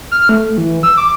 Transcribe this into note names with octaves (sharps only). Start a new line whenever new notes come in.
F6
A3
E3
E6
D6